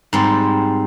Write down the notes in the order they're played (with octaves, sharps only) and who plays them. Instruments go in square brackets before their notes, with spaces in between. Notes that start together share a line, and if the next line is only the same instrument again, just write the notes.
[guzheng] G#2 G3 C4